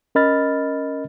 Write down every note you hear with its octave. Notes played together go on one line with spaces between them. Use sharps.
C#4 A#4 D#5 B5 F6 A6